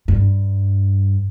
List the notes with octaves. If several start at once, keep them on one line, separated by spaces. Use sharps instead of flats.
G2